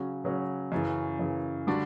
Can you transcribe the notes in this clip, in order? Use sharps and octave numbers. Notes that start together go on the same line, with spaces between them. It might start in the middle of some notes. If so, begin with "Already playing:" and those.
Already playing: C#3 F#3 C#4 F#4
C#3 F#3 C#4 F#4
F#2 C#3 E3
F#2 C#3 E3
D3 G3 D4 F#4